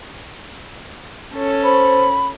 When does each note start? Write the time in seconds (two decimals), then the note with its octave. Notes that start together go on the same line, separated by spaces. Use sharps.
1.33 C#4 A4 C#5
1.64 C5 B5